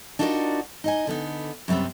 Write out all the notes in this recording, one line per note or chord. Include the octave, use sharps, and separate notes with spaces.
D4 D#4 F4 F#4 A#4 D5
D#4 D#5 G#5
D3 B3 D#4
F#2 C3 G3 B3 C4